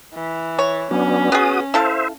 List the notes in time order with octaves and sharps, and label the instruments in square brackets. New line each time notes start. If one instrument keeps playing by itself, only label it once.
[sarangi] E3
[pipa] C#5
[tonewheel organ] F#3 B3 D4 [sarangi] C#4
[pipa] B3 G#4 [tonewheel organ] F#4 D#6
[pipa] E4 A4 F5 [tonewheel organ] C5 E5